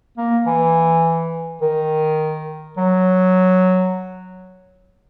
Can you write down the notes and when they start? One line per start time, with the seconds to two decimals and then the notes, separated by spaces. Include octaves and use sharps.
0.17 A#3
0.47 E3
1.62 D#3
2.77 F#3